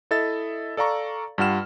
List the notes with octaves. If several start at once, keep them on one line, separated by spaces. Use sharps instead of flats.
E4 A4 D#5 E5 A6
A4 D5 F5 A#5 C#6
G2 G3 F4 F#5 F6 E7